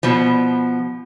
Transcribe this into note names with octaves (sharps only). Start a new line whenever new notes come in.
B2 F3